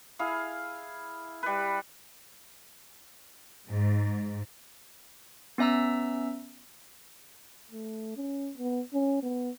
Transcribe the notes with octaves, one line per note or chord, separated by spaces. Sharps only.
E4 G#4 F5
G3 B4
G#2
B3 C#4 E5 A#5 E6
A3
C#4
B3
C#4
B3